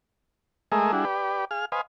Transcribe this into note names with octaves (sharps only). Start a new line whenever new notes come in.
G#3 A3 G#4 A#4 D#5 E5
G3 D4 E4 F#4 G#4
G4 B4 D5
G#4 F5 F6
B4 C5 D#5 F5 G#5